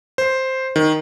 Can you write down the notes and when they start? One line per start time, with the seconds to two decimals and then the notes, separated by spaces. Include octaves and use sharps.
0.18 C5
0.76 D#3